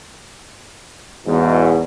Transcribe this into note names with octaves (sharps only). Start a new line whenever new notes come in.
E2 G#2 B2